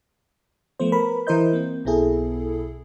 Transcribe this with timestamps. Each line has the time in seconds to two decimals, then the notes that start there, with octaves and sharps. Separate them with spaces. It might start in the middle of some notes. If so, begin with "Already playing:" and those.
0.80 F3 A3 B3 C5
0.92 A#4 B4 B5
1.27 E3 E4 A#4 C5 D#5 G6
1.53 A#3 C4
1.85 B1 B2 B3 E4 G#4 A4